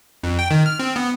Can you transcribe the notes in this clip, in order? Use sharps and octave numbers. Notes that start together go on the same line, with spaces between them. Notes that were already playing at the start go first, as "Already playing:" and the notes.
F2
G5
D#3
F6
C4
B3